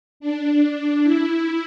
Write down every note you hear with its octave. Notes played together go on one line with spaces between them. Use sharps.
D4
E4